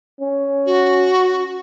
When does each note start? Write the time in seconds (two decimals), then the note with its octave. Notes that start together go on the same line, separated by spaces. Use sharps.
0.20 C#4
0.66 F#4